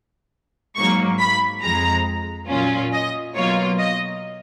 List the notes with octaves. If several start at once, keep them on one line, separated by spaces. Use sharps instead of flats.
G#2 F#3 A#3 C#6
B5
F2 F3 G#3 A#5
A#2 F#3 C#4 F4
D#5
B2 F#3 A#3 F4 C#5
D#5